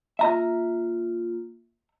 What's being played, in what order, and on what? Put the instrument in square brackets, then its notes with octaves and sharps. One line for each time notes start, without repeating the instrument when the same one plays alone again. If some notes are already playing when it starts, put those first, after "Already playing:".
[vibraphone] A#3 F4 [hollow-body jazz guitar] E5 A#5